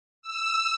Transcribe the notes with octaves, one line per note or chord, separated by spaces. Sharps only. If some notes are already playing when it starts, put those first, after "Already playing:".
E6